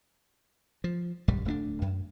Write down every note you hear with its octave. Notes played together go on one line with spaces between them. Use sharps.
F3
D#1 A#1 F#2 G3
D1 A3 C4 D4
F#2